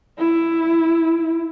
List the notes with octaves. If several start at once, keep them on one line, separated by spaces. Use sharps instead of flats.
E4